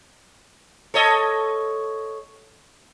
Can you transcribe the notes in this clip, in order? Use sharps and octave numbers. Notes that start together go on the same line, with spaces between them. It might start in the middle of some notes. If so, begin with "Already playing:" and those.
A4 C#5 D#5